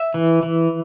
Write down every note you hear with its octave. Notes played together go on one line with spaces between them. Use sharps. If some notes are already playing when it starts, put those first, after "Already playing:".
Already playing: E5
E3
E3